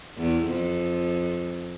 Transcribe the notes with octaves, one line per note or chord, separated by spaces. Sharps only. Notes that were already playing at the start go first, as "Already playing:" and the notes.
E2
F2